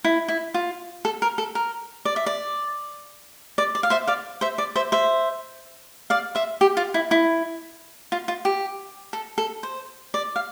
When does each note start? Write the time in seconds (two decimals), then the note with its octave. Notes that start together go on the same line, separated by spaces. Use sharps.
0.04 E4
0.28 E4
0.54 F4
1.05 A4
1.22 A#4
1.38 A4
1.55 A#4
2.05 D5
2.16 E5
2.26 D5
3.58 D5
3.75 D5
3.83 F5
3.90 C5 E5
4.07 D5 F5
4.41 C5 E5
4.58 D5
4.76 C5 E5
4.92 C5 E5
6.10 D5 F5
6.35 C5 E5
6.61 G4
6.77 F4
6.94 E4
7.11 E4
8.12 F4
8.28 F4
8.45 G4
9.13 A4
9.38 A4
9.63 C5
10.14 D5
10.36 F5